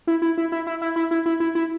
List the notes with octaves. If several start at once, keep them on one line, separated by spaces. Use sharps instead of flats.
E4
E4
E4
E4
E4
E4
E4
E4
E4
E4
E4